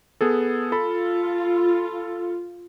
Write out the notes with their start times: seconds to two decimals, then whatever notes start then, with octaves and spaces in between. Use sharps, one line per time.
0.21 B3 G#4 A4
0.72 F4 A4 B5